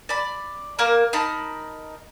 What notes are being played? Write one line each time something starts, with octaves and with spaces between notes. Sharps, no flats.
D5 B5
A#3 A#4
D#4 A#4 A5 B5